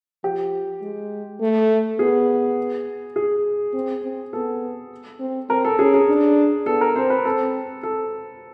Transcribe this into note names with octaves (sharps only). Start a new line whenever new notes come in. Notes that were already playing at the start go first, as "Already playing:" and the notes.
F3 G4
G#3
A3
B3 G#4
G#4
C4
C4
B3 A4
C4
C4 A#4
A4
C#4 G#4
G#4
D4
B3 A4
A#4
C4 C5
B4
C4 A4
A4